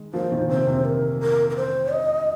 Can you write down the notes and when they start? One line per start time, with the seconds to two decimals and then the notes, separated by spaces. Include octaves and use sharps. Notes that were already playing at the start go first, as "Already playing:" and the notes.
Already playing: D#3 G#3
0.14 F3 A#3 C5
0.32 A#2 D#3
0.49 C3 C5
0.67 C3
0.85 A#4
1.21 A#4
1.50 A#4
1.56 C5
1.92 D#5